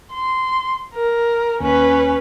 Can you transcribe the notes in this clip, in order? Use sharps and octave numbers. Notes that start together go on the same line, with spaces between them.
C6
A#4
D#2 C#4 B4